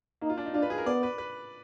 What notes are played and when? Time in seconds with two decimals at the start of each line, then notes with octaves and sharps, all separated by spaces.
0.21 A#3 D#4
0.30 F4
0.38 D4
0.46 D#4
0.54 D4 F4
0.62 B4
0.70 G#4
0.78 A#4
0.86 B3 D5
1.03 B4
1.18 B4